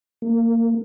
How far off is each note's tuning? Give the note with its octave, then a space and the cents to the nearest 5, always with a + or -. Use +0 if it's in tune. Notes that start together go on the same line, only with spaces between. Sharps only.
A#3 -20